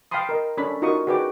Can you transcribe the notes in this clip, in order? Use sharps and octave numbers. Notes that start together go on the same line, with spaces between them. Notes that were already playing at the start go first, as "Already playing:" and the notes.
F5 G5 A5 B5 C6 D#6
A#4 D#5
C#4 D4 A4 B5
D#4 F4 F#4 A#4 C#6 D#6
F#4 G#4 B4 D5 G5 D6